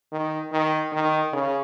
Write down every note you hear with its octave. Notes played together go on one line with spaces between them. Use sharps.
D#3
D#3
D#3
C#3